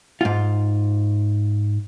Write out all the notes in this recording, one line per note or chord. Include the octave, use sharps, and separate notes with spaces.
G#2 F4